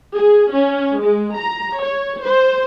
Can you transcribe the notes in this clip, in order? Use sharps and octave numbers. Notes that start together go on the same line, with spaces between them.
G#4
C#4
G#3
A#5
C#5
C5